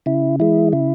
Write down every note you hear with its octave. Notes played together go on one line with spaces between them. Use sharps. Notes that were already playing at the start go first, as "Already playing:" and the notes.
C#3 E4
E3 G#3 E4
C#3 E4